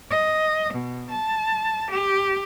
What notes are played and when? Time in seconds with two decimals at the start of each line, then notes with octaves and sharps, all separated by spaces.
0.11 D#5
0.75 B2
1.10 A5
1.92 G4